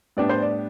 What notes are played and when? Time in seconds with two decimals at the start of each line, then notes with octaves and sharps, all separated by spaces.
0.17 A2 G3 B3 D4 G4 D5
0.29 C5
0.42 D5